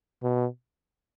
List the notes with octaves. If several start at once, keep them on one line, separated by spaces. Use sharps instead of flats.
B2